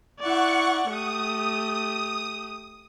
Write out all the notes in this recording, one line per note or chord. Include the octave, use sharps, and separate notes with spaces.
E4 D5 F#5 C#6
A3 G4 D#6